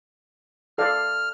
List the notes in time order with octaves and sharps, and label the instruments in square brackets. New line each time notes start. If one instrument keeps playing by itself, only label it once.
[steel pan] A4 D5 F5 [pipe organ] F6